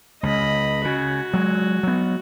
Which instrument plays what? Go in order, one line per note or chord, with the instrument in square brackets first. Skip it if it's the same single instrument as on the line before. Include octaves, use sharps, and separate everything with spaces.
[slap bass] C#2 [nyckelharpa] D#5 B5
[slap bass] C#3 [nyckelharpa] F#4
[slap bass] F#3 G#3
F#3 B3